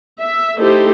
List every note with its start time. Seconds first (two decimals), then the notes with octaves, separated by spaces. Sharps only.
0.19 E5
0.58 A3 D#4 E4 G4 A4 C5